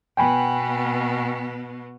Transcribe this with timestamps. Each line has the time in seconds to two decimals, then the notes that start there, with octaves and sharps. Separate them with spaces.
0.17 B2 B3 G5 G#5 B5